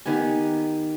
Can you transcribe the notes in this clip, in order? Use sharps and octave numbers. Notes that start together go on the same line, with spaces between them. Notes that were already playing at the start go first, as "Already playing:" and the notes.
D#3 B3 G4 G#5